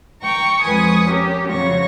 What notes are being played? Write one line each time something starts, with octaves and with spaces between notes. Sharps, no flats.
G5 A#5 C#6
F2 G#3 B4 G#5 C#6 D#6
C#4 G4 A#4
F2 C#3 F#3 C#5 C#6 A#6